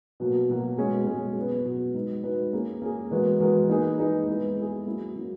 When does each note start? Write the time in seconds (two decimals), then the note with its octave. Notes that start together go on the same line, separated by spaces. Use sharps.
0.20 B2 F#3 A#3
0.49 B2 F#3 A#3
0.78 B2 G#3 C#4 G#4
1.07 B2 G#3 C#4 G#4
1.36 B2 F#3 B3
1.65 B2 F#3 B3
1.94 G#3 D#4 F#4 B4
2.23 G#3 D#4 F#4 B4
2.53 A#3 C#4 G#4
2.82 A#3 C#4 G#4
3.11 E3 G#3 B3 F#4 A#4
3.40 E3 G#3 B3 F#4 A#4
3.70 A#3 D#4 G#4 B4
3.99 A#3 D#4 G#4 B4
4.27 G#3 B3 E4 G#4
4.57 G#3 B3 E4 G#4
4.86 F#3 A#3 C#4 E4
5.15 F#3 A#3 C#4 E4